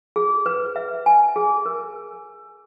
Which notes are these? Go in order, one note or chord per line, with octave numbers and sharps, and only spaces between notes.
G#4
B4
E5
G#5
G#4
A#4